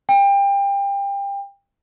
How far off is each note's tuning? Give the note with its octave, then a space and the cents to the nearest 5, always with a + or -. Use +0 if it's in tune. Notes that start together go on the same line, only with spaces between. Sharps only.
G5 +25